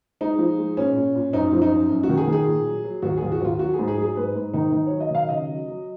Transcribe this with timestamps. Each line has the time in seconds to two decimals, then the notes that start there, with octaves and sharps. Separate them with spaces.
0.21 G#3 D#4
0.38 F3
0.58 G#3
0.77 A#2 C#4
0.96 A#2
1.15 A#2
1.33 F#2 D#4
1.52 F3
1.62 D#4
1.71 F#2
1.90 F#2
2.03 F#4
2.09 D#3
2.18 G#4
2.27 D#3
2.32 G#4
2.46 A#2
2.66 F#3
2.84 F#3
3.02 D#2 F#4
3.17 D#2 G#4
3.32 F#4
3.41 D#2 F4
3.59 F#3 F#4
3.74 G#4
3.79 G#2
3.88 G#4
3.97 F#3
4.02 G#4
4.16 G#2 B4
4.35 G#2
4.54 D#3 D#4
4.72 D#3 D#4
4.86 F#3 C#5
5.00 D#5
5.11 D#3 F5
5.29 C#3 D#5
5.48 F#3
5.67 F#3